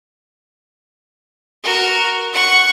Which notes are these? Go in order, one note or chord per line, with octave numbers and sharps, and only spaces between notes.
F#4 A#4
F#5 C#6